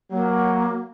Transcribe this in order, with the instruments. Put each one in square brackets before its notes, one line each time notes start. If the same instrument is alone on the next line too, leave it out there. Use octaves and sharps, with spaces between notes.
[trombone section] F#3 [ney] A#3